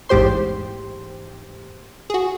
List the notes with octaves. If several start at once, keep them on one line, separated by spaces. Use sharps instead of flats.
A1 E2 G#2 G4 C5 C6
F#4 G#4